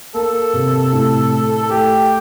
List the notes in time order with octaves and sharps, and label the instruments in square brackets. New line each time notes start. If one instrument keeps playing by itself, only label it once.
[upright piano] A#3 [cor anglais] A4
[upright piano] C3
A2
A3
[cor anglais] A4
[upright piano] A3 [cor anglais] G4